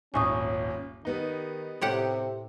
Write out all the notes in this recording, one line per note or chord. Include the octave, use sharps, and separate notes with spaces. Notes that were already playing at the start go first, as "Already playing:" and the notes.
D#1 G#1 C#4 G#5 C#6 D#6
D#3 G3 B3 D#4
A2 C3 G4 F#5